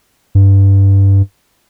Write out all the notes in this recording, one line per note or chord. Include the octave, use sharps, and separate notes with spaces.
G2